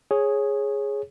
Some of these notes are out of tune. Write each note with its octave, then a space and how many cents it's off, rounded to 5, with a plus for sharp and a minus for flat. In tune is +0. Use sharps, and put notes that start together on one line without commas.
G#4 +0 C#5 -10